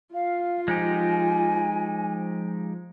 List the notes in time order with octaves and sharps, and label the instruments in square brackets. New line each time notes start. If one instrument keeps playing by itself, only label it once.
[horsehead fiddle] F4 [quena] F5
[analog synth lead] F3 [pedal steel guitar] G#3 D#4 G4 [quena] G#5